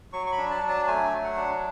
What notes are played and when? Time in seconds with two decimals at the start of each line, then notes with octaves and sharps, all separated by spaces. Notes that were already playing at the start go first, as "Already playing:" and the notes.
0.13 F#3 C#6
0.27 C#6
0.32 B5
0.38 D4
0.51 A5
0.63 F#3
0.69 A5
0.87 A3 G#5
1.12 F#3
1.24 F#5
1.37 D4